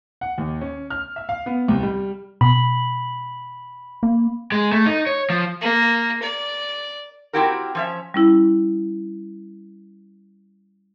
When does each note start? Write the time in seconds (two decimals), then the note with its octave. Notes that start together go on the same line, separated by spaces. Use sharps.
0.21 F#5
0.38 D#2
0.61 C#4
0.90 F6
1.16 E5
1.29 F5
1.46 B3
1.68 C2
1.83 G3
2.41 B2 B5
4.03 A#3
4.52 G#3
4.72 A3
4.86 D#4
5.07 C#5
5.30 F3
5.61 A#3
6.22 D5
7.33 C4 C#4 E4 F#4 G4 A#4
7.75 F3 C#4 E5
8.14 G3 C#4 E4